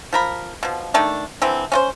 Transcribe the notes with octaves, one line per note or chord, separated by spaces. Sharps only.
F3 A#4 B5
B2 F3
D#3 A3 D4
D3 E3 C4
C#4 F4 C5